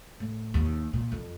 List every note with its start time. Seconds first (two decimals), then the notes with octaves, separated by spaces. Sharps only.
0.20 A2
0.54 D#2
0.93 A#2
1.12 F2